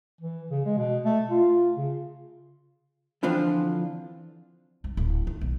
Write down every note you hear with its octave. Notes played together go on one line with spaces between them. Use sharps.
E3
C#3
G#3
B2
A3
F4
C#3
D3 E3 F3 C4 D4 F4
C2
D1
D#3
B1